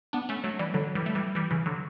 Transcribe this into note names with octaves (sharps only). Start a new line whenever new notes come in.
B3 D4
A3 C#4
F#3 A3
E3 G3
D3 F#3
E3 G3
A3
E3 G3
E3 G3
C#3 E3
D3 F#3